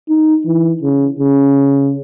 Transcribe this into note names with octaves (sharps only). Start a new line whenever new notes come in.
D#4
E3
C#3
C#3